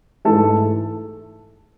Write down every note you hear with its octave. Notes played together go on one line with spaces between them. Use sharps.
G#2 E3 A3 A4 A5